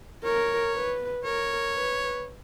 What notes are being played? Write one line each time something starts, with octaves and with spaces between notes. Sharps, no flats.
A#4 C#5
B4
A#4 C#5
B4